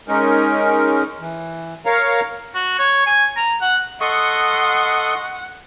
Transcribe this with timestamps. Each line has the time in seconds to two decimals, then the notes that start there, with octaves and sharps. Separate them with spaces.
0.08 G#3 C#4 D#4 A#4
1.20 E3
1.86 A#4 C#5 F5 A#5
2.55 F#4
2.79 C#5
3.06 G#5
3.37 A#5
3.61 F#5
4.01 A4 D#5 F#5 C6 C#6 D#6